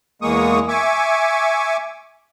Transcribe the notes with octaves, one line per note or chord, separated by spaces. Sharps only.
E2 G#3 A#3 C#6 D#6
E5 G#5 C#6 D6